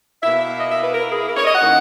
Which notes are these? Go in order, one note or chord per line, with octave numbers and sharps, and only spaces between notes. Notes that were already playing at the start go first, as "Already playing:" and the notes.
B2 A#3 E4 E5
E5
D#5
E5
B4
A#4
G#4
A#4
C#5
D#5
F#5
D#3 A#3 C#4 E4